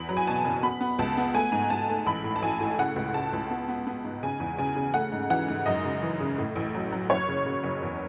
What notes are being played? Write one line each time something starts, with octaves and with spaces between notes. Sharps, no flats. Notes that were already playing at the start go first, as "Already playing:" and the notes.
Already playing: E2 B5
F#3
G#5
B2 A5
F#1
B3 B5
B3
C#2 A5
B3
A3 G#5
G#2
G#2 A5
A3
A1 B5
A2
A5
A1 G#5
A2
C#3 F#5
C#2
C#3 A5
C#2
B3
B3
B3
G#2
C#3 G#5
E2
C#3 G#5
C#3
A3 F#5
G#2
E3 F#5
G#2
F#2 D#5
C#3
E3
C#3
A2
A1
F#3
F#3
F#1 C#5
C#3
C#3
F#1
E2